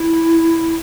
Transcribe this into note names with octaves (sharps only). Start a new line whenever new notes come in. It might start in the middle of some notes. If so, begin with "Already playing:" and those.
Already playing: E4